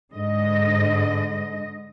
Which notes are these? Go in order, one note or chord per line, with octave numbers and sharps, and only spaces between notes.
G#2 D3 D#5